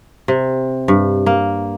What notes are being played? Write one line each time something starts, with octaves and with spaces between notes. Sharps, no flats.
C3
G2
A#3